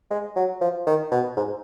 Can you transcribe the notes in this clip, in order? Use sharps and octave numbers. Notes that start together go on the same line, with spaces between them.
G#3
F#3
F3
D#3
B2
G#2